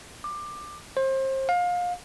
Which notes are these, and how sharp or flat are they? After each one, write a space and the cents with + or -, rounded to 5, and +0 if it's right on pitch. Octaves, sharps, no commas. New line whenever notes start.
D6 +20
C5 +30
F5 +25